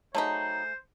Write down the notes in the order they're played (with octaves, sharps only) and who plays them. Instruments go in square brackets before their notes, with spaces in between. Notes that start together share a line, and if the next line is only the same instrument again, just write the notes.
[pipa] F#3 D#4 [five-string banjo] A3 G#4 B5 [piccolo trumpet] C5